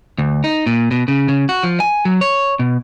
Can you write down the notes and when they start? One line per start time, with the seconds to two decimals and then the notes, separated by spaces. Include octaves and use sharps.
0.18 D2
0.44 D#4
0.66 A#2
0.91 B2
1.08 C#3
1.29 C#3
1.49 F#4
1.63 F3
1.80 G#5
2.05 F#3
2.21 C#5
2.59 B2